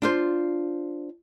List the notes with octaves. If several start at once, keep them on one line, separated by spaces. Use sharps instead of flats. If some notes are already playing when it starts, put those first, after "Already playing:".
D4 F4 C5